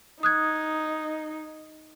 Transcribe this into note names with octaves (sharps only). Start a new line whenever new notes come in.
D#4 D#6 F#6 G#6